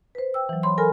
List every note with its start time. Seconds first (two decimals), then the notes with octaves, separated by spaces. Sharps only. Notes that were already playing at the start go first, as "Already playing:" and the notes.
0.15 B4 C5
0.34 G5 E6
0.49 E3 F#3
0.63 C#5 B5 C6
0.78 A4 A#4 G#5 B5 F6